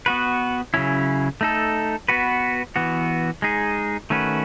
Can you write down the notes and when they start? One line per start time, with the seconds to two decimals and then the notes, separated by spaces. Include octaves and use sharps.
0.06 B3 F#4 B4
0.74 C#3 F#3 C#4 E4
1.41 A3 D#4 A4
2.08 B3 F#4 B4
2.76 E3 B3 F#4
3.42 G#3 D#4 G#4
4.10 D#3 A3 C#4 F#4 B4